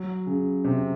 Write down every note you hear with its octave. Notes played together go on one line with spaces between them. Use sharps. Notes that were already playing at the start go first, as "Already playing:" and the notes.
Already playing: F#3
C#3
C3